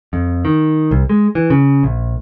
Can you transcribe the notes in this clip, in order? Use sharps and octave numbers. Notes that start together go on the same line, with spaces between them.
F2
D#3
C2
G#3
E3
C#3
A#1